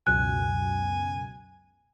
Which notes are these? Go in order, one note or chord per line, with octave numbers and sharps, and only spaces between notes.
C#2 F#2 B2 G#5 F#6